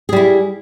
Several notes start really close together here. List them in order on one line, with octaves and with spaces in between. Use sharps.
G#4 G3 E4